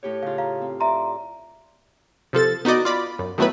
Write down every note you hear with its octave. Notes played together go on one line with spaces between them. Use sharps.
A2 G4 C#5
C#3 F4 F5
F5 A#5
C4
D5 E5 A#5 C6
C3 F3 A4 A6
B3 D#4 F#4 D5 D#5
F4 D5 B5
F#2
D#3 F#3 A3 B3 E4 B4